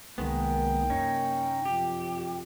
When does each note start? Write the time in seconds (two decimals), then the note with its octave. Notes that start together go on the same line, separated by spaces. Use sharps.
0.18 C2 D#3 G#3 A#3 B3 G5
0.90 F#2 C3 C#4 D#4
1.65 F2 G4